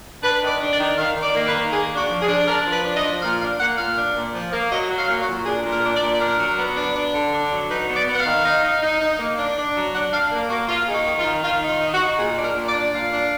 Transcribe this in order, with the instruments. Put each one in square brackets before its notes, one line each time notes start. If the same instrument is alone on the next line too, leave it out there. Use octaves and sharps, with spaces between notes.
[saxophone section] D4 B4
D#3
D5
D4
D5
D#3
D#3 F5
D#3
D5
A#3
B4
D#3
A#3 G#4
D4
F#4
F3
G#4
D4
D4 A#4
F3
B4
D4
D#5
F3
A#2 F5
D4 F5
A#3 F#5
A#2 F5
D4
A#2
F3
A#3
F#3 D#5
F#3
F5
A#2
F#4
A#2
D4 G#4
A#2
A#4
D4
D5
A#2
D4 A#4
F#3
B3
D4
D4
D3
D4
F#3
D#4 B4
B3
D5
B3
F#5
F5
D#3
D#4
D#4
D#4
D#4
A#3
D4
D4
F#3
D4 F#5
D4 F5
A#3
A#3 F#4
A#3 F4
D#4 G#4
F#4
D#3
F4
D#3
D#3 F4
D#4
F4
D#4
F#4
D#4
A#2 G#4
D4
A#4
A#2
D5
D4
A#2 F5
D4